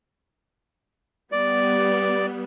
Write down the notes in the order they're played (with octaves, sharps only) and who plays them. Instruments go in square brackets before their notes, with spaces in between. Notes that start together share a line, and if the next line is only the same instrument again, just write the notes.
[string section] G3 B3 [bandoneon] D5